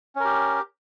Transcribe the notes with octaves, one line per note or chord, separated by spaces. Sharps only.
C#4 G4 A#4